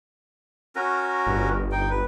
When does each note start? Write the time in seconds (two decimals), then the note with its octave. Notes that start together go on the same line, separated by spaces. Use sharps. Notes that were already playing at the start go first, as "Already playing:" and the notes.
0.76 C#4 F#4 A#4
1.27 G1
1.72 D#4 G5
1.90 B4